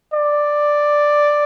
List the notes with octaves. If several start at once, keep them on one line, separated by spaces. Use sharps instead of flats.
D5